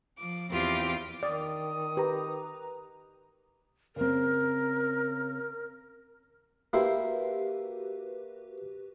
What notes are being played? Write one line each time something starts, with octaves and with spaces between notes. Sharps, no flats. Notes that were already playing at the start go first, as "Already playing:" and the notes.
F3 D6
E2 C4 F4 G4 D6
D#3 D5 D#6
G4 B4 A#5
C#3 C4 A#4
A#3 E4 F#4 G4 B4 C5